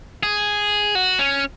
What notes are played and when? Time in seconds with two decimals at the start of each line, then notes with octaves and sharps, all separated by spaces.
0.23 G#4
0.95 F#4
1.19 C#4